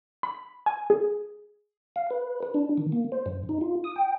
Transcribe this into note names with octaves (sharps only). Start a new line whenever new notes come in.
B5
G#5
G#4
F5
B4
B4
D4
D#3
A#3
C5
F#2
D#4
F4
D#6
G5